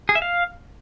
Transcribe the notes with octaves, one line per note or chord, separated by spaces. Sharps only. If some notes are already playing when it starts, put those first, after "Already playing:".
G#4
E5
F5